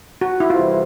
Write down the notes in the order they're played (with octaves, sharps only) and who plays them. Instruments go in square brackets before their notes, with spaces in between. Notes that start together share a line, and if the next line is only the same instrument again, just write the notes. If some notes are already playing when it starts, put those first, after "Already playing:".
[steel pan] F#4
E4
[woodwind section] F2 C3 E3 G3 [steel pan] F4